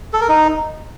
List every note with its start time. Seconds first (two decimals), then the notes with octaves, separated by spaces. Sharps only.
0.13 A4
0.21 A#4
0.29 D#4